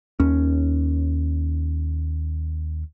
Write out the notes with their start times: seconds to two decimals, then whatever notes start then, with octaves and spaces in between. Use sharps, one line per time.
0.20 D#2 C#4